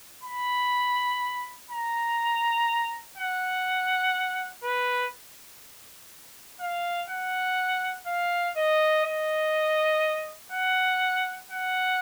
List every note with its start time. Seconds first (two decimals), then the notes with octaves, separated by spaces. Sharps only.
0.23 B5
1.70 A#5
3.17 F#5
4.63 B4
6.60 F5
7.09 F#5
8.06 F5
8.56 D#5
9.04 D#5
10.52 F#5
11.51 F#5